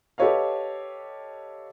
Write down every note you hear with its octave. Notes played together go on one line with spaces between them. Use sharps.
G4 A4 B4 C#5 D#5 F5